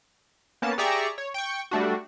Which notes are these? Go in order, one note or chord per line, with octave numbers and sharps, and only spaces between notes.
A#3 B3 C#4 A5
G4 G#4 D5 E5 A#5 C#6
C#5
G5 C#6
G3 A3 D4 F#4